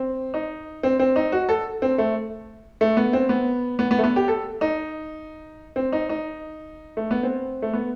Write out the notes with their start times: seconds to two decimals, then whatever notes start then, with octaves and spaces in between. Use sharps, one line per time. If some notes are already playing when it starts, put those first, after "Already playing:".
Already playing: C4
0.34 D#4
0.83 C4
0.99 C4
1.16 D#4
1.32 F#4
1.49 A4
1.82 C4
1.98 A3
2.81 A3
2.97 B3
3.13 C4
3.29 B3
3.79 B3
3.91 B3
3.99 A3
4.04 B3
4.16 G4
4.28 A4
4.61 D#4
5.76 C4
5.93 D#4
6.09 D#4
6.97 A3
7.11 B3
7.23 C4
7.62 A3
7.73 B3